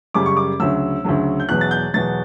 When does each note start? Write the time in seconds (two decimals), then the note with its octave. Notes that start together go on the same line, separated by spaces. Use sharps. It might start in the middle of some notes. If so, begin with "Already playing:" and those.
0.14 F#2 C#3 G3 D6
0.26 C#6
0.37 D6
0.60 D2 C#3 F#3 E6
1.04 D2 C#3 F#3
1.40 G6
1.49 E2 B2 F#3 F#6
1.61 A6
1.71 G6
1.94 E2 B2 F#3 A6